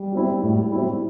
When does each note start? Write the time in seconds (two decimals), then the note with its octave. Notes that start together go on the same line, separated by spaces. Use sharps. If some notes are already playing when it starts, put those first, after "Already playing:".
Already playing: G3
0.12 F#3 C4 E4
0.43 A2
0.72 F#3 C4 E4